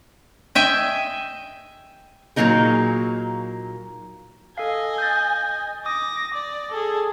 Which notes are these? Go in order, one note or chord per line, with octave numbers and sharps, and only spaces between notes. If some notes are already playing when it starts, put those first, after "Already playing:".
D#5 E5 G5 G#5
A#2 D3 F#3 A#3 D#4 G#4
A4 D#5 F5 G#5
G6 A6
D6 D#6 A#6
D5
G#4 A4